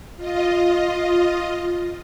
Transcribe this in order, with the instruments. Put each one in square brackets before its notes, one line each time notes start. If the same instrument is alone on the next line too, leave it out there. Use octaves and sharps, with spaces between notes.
[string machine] F4 D#5